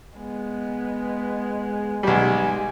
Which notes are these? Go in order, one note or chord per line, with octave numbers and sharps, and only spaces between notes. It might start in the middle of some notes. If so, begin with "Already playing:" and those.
G#3 B3
B1 G3 G#3 G#5